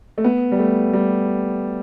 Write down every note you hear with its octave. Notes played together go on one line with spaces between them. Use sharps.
A3
B3
G3
A3
G3